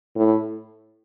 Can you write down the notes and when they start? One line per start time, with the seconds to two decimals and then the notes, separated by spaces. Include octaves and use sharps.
0.16 A2